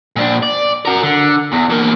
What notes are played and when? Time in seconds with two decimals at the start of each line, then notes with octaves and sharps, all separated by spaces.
0.16 A#2 D4
0.43 D5
0.85 F#4 A#4
1.03 D3
1.53 E2
1.70 E3 A#3